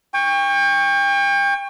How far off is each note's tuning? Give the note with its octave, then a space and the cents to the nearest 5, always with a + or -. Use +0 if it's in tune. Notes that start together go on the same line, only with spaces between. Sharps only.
G5 +35 C#6 +0